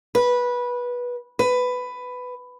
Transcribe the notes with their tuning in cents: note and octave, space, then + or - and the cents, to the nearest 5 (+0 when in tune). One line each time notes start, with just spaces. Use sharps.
B4 -15
B4 +10